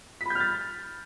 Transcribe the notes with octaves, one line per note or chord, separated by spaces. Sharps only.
B5 F6 G6 A6 B6